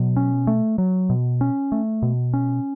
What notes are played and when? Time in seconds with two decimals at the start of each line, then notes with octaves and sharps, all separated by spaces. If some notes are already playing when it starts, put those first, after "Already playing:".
Already playing: B2 F#3
0.16 C#4
0.47 A3
0.78 F#3
1.10 B2
1.41 C#4
1.72 A3
2.02 B2
2.33 C#4